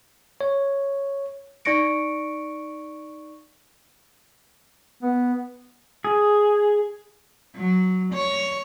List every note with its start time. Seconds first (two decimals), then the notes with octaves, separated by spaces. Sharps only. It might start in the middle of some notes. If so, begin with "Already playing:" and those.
0.41 C#5
1.65 D#4 D5 C#6 A#6 C#7 D7
5.03 B3
6.04 G#4
7.56 F#3
8.13 C#5